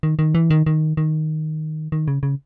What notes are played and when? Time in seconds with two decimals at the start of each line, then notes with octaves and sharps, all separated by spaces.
0.03 D#3
0.19 D#3
0.35 E3
0.50 D#3
0.66 D#3
0.97 D#3
1.92 D#3
2.08 C#3
2.23 C#3